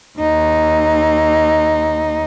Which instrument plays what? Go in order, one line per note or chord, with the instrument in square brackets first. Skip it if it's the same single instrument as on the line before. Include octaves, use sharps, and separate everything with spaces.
[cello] D#2 D#4